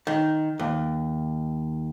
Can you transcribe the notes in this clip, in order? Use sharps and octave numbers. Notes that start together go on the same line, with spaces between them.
D#3
D#2